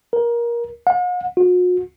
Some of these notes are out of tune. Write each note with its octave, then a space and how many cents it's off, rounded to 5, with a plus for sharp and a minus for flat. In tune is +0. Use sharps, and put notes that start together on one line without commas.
A#4 +20
F#5 -45
F#4 -45